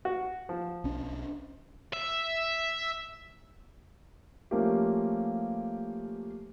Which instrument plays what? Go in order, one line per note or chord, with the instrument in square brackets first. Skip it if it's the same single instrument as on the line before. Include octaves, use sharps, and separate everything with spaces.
[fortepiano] F#4
F3
[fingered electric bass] B1 C#4 D4
[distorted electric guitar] E5
[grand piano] F3 A3 A#3 C#4 F4 G4